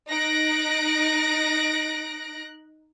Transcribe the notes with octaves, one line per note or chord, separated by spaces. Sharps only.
D#4 F#6 A#6 D7